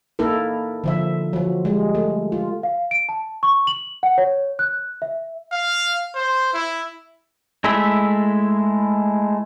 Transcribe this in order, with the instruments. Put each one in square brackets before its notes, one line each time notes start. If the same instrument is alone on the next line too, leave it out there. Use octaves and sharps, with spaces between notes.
[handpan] A#3 D#4 E4 A4 A#4
D3 F3 E5
F3 F#3
G3 G#3
A3
F4
[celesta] F5
D7
A5
C#6
F#7
F#5
C#5
F#6
E5
[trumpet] F5
C5
E4
[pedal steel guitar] G#3 A3 E4 E5